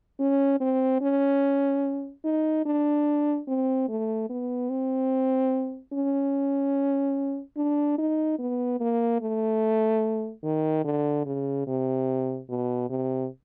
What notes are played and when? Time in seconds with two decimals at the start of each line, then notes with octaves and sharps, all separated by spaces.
0.20 C#4
0.60 C4
1.01 C#4
2.25 D#4
2.66 D4
3.47 C4
3.89 A3
4.30 B3
4.70 C4
5.93 C#4
7.57 D4
7.98 D#4
8.39 B3
8.80 A#3
9.21 A3
10.44 D#3
10.85 D3
11.26 C#3
11.67 C3
12.49 B2
12.90 C3